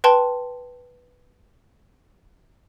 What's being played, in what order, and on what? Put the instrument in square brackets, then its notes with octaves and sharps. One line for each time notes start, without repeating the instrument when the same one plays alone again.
[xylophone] B4 G5 A5 C6